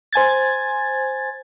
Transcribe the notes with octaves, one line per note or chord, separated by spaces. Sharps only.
C5 G#5 G#6 A6